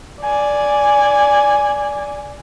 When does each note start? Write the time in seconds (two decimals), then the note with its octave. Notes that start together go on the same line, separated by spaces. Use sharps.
0.23 D5 G#5